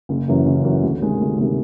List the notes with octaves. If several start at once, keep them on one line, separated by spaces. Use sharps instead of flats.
F#1
F#2 C#3 E3
F#1
F#2 C#3 E3
D2
C3 D#3 G#3
D2
C3 D#3 G#3